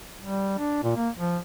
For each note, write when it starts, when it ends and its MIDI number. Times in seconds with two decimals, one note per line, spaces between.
0.21 0.56 55
0.58 0.81 62
0.83 0.94 46
0.96 1.09 58
1.17 1.38 53